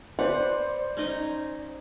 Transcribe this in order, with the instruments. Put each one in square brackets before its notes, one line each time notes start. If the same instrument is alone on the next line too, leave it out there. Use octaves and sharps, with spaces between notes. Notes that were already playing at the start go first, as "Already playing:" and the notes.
[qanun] B4 F#5 [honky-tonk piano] C5 D5
[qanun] C#4 D#4 D#5